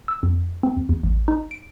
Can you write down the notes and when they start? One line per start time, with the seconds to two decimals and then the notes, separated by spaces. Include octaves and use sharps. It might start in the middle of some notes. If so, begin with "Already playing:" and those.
0.08 E6
0.23 F2
0.63 C4
0.77 E2
0.89 E2
1.03 A1
1.28 D#4
1.51 D7